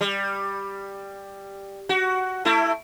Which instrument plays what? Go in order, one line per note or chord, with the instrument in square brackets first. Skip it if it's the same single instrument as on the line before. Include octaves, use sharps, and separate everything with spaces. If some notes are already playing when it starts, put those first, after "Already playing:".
[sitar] G3
F#4
A3 E4